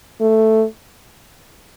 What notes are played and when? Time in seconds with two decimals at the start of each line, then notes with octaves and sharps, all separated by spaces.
0.21 A3